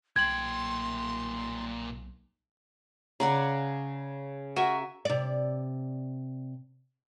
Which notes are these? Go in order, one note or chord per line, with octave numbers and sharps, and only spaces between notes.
B1 A#2 G5 C6 G#6 F#7
C#3 D5 F#5 A#5
F#4 A#4 E5 G#5
C3 D5